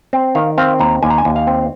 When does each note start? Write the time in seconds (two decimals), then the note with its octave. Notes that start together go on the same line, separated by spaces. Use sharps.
0.13 C4
0.35 D#3 F5
0.58 C4 F5
0.80 D#2 A#5
1.03 D#2 G#5
1.10 A#5
1.18 G#5
1.25 D#2
1.36 F5
1.47 C4